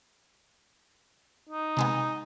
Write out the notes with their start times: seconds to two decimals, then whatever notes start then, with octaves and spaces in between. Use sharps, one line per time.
1.49 D#4
1.77 C3 G#3 B3